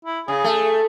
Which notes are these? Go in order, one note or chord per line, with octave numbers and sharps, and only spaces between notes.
E4
C#3 G#4
A3